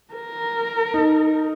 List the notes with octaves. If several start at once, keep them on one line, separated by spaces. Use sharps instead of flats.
A#4
D#4